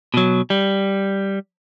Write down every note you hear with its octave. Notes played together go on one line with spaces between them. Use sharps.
B2 F#3
G3